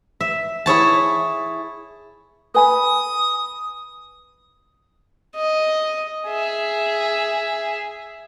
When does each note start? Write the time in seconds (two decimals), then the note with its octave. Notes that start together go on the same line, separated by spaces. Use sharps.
0.21 E5
0.66 E4 G#4 C#5 A5
2.54 B4 G#5 B5 D#6
5.36 D#5
6.27 G#4 E5